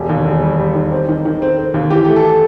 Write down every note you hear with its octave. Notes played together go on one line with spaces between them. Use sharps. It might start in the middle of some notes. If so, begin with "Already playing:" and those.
Already playing: E1 G4
D#2
E1
G3
G3
D#3
C4
D#3
D#3
C4
C4
D#2
E3 G4
A3 G4
A4